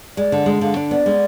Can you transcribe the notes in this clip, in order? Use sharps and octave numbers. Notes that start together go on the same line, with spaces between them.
G#3 D5
D3
G#3
D3 F5
D4
B3 D5
G#3